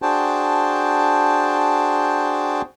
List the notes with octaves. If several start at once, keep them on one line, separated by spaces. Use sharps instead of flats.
D4 F#4 G#4 C5 G5 A5